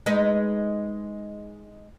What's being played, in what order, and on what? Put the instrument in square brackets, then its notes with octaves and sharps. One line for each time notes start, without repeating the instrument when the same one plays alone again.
[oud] G#3 D#4 B4